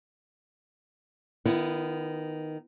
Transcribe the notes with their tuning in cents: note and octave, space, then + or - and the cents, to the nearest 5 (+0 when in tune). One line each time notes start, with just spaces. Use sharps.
D#3 +0 B3 +0 E4 +40